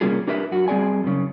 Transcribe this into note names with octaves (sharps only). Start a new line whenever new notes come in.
C3 G3 A#3 C#4 F4 G#4
D4 G4 A#4 B4 E5
F#2 F#4
G3 C4 G#4 D5 G#5
F#2 C#3